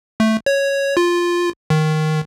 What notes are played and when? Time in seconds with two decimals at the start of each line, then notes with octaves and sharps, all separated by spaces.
0.20 A3
0.46 C#5
0.97 F4
1.70 D#3